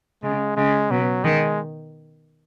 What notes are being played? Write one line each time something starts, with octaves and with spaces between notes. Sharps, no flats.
C#3 G#3
C#3 G#3
B2 F#3
D#3 G#3